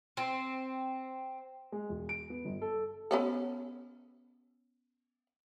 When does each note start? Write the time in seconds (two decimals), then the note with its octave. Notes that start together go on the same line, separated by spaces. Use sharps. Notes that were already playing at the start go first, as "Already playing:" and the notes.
0.17 C4
1.72 G#3
1.89 E1
2.09 D7
2.30 B3
2.45 G1
2.62 A4
3.11 B3 C#4 A4